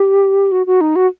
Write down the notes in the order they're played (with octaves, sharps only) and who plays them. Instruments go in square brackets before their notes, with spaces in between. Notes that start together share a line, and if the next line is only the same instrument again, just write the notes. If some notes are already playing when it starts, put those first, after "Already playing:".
Already playing: [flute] G4
F#4
F#4
D#4
F#4